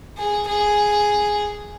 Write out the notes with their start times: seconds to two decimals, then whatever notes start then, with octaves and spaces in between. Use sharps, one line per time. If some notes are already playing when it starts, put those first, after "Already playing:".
0.17 G#4
0.48 G#4